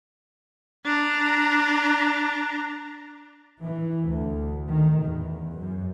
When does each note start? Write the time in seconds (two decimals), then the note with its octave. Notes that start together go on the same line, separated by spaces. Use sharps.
0.85 D4 A#5
3.63 E3
4.10 D2
4.69 D#3
5.06 E2
5.58 F#2